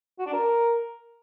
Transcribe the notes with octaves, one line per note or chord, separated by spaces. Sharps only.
F#4
D4
A#4